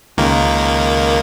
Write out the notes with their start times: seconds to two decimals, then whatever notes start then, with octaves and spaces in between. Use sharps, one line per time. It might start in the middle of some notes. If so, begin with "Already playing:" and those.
0.18 C#2 D#3 A#3